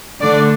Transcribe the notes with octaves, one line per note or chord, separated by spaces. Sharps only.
D3 A3 D4 D5